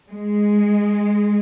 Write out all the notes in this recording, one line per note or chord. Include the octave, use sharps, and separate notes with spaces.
G#3